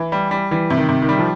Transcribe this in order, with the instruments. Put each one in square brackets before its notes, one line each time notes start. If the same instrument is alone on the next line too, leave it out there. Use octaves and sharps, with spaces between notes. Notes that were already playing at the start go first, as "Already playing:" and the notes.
Already playing: [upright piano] E3
G3
G3
[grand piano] E3 [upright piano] G3
[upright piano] C3
[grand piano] D#3
[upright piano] C3
[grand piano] D#3
[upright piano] G3
[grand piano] F3